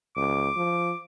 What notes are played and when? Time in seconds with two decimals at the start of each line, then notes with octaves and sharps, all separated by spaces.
0.16 C#2 D6
0.56 F3